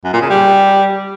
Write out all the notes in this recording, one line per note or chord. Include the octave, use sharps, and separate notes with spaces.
F#2
A#2
C#3
G3